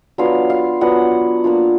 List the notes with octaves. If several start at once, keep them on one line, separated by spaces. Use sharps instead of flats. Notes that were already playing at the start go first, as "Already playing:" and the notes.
F#3 B3 D4 F4 F5
F5
F#3 B3 D4 F4 F#5
A#3 D4 F4